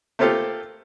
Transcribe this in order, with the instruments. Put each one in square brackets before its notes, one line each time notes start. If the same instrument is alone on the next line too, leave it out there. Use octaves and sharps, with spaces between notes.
[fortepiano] A3 A#3 C4 F4 G4 A4